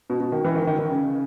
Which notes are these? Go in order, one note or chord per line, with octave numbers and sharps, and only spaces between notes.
B2
B2
D#3
E3
D#3
D#3
D#3
C#3